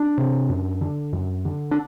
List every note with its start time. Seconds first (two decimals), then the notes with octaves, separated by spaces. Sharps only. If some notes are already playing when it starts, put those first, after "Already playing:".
Already playing: D4
0.18 C3
0.50 F#2
0.81 D3
1.13 F#2
1.45 D3
1.71 D4